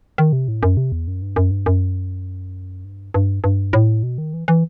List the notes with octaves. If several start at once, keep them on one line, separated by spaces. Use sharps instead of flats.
D#3
C3
A2
F#2
C3
E2
F#2
G2
F#2
G2
F#2
G2
G2
G2
A2
B2
D#3
E3
E3